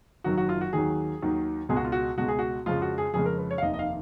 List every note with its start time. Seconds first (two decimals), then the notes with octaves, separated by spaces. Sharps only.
0.24 F#1 F#2 D#3 F#3 F#4
0.37 F#4
0.49 F4
0.61 F#4
0.73 D#2 D#3 F#3 G#4
1.22 D#2 D#3 F#3
1.69 C#2 B2 G#3 G#4
1.76 F#4
1.84 F4
1.92 F#4
2.18 C#2 B2 G#3 F#4
2.28 G#4
2.39 F#4
2.66 F2 C#3 F3 G#3 F4
2.82 F#4
2.98 G#4
3.14 F2 C#3 F3 G#3 G#4
3.26 A#4
3.38 B4
3.51 C#5
3.58 F5
3.62 F1 D#2 D#3 D#5
3.74 D#5
3.79 F5